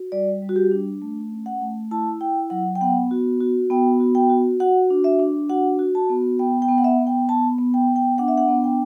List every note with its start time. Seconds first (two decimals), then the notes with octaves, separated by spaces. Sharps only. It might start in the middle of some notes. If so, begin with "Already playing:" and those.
Already playing: F#4
0.12 G3 D5
0.42 G3
0.49 F#4
0.56 G4
0.72 D4
1.02 A3
1.31 C#4
1.46 F#5
1.61 A3
1.91 E4 A5
2.21 E4 G5
2.50 F#3 F#5
2.75 G5
2.81 B3 F#5
3.11 F#4
3.41 F#4
3.70 B3 G5
4.00 F#4
4.15 G5
4.30 F#4
4.60 F#4 F#5
4.90 D4
5.04 E5
5.19 D4
5.50 F#4 F#5
5.79 F#4
5.95 A5
6.09 B3
6.39 B3 G5
6.62 G5
6.69 B3
6.78 F#5
6.84 E5
6.99 B3
7.07 G5
7.29 B3 A5
7.58 B3
7.74 G5
7.89 B3
7.96 G5
8.18 D4 F#5
8.28 E5
8.38 F#5
8.49 B3
8.64 G5